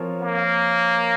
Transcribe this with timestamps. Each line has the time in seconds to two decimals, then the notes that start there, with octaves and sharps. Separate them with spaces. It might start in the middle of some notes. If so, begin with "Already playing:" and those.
Already playing: F3 C4 F4 A#4 C#5
0.21 A#3